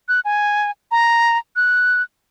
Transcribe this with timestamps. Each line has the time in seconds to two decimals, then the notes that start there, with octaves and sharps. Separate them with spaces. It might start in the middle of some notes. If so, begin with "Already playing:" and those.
0.09 F#6
0.25 G#5
0.91 A#5
1.56 F#6